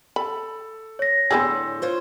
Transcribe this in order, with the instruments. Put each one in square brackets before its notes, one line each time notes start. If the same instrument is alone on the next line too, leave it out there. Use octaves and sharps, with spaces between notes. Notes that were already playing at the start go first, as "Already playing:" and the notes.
[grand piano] A4 [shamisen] B5
[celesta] C#5 A#6
[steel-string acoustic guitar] A2 D3 [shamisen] B3 G4 G#4 [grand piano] C6 E6 G6
[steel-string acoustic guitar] F4 C5 C#5